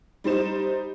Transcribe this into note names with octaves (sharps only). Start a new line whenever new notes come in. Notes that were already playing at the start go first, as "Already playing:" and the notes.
G3 D#4 C5 E7